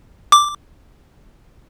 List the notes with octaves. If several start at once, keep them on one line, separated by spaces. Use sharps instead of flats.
D6